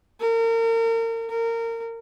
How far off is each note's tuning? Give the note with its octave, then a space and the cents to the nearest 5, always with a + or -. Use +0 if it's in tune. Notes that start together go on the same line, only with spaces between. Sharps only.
A#4 -35
A#4 -25